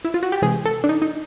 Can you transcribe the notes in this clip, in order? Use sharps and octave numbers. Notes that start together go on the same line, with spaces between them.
E4
F4
F#4
G4
C3 E3 G#3 G#4
A4
D4
D#4
D#4